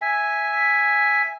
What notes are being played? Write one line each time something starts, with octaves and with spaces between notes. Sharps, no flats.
E5 G#5